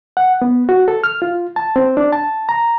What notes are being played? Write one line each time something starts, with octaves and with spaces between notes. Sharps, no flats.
F#5
B3
F#4
A4
F6
F4
A5
C4
D4
A5
A#5